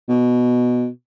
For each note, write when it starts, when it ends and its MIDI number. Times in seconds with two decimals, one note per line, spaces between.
0.09 0.87 47